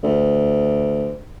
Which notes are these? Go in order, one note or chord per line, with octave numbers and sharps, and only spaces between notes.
D2